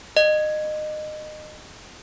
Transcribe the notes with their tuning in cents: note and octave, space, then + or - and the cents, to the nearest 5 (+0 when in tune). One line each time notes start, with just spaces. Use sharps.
D#5 -25